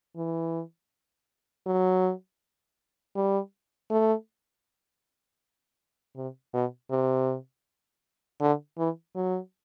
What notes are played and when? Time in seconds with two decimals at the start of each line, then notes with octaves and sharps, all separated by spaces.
0.17 E3
1.66 F#3
3.16 G3
3.91 A3
6.16 C3
6.53 B2
6.90 C3
8.41 D3
8.78 E3
9.15 F#3